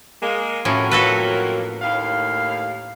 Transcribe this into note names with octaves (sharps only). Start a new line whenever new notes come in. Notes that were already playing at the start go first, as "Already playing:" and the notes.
G#3 A#3
F2 A2 F#3 A#3 C#4
F#4 A4 B4
D#2 A2 F5